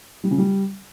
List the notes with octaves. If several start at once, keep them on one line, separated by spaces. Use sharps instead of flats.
G3
C#3
G3